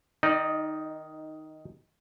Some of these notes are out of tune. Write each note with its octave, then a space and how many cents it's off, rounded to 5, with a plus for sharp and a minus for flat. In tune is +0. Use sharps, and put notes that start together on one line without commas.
D#3 +0 D#4 +10 D5 +45